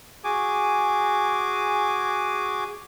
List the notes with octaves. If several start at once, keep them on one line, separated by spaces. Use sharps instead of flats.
F#4 G#4 G#5 D6